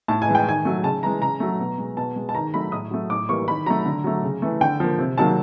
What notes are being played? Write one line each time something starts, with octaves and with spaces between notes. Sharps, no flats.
A2 A5
G#5
E3 G#3
G5
D#3 G#5
F#3 A3
C#3 A5
E3 G#3 A#5
C#3 A#5
F#3 A3
B2
G#3
B2 A5
G#3
A5
D#3 A#5
F#3 A3 B5
A2 D#6
F#3 A3
A2 D6
E3 G3 A#3 C#6
D#3 B5
F#3 A3 A#5
D3
F#3 A3
C#3
E3 A3
D3 G5
F3 A#3
C3
D#3 F#3 A#3 A5